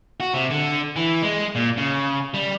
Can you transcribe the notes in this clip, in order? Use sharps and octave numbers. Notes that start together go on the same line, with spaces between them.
F#4
C3
D3
E3
G#3
A#2
C#3
G3